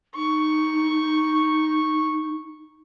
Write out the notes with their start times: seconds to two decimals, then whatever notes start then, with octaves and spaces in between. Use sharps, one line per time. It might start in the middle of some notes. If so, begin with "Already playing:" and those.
0.16 D#4 C#6